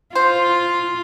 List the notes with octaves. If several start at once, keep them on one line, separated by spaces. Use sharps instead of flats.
F4 C5